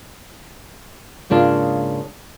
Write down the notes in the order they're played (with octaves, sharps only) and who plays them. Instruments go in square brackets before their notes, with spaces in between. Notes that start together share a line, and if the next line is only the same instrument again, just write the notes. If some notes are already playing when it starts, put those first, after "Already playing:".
[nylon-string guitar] G#2 C#3 A#3 D4 F4